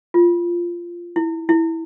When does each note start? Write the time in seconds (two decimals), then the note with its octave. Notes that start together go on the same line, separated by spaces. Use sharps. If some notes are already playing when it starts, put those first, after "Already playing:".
0.14 F4
1.16 E4
1.49 E4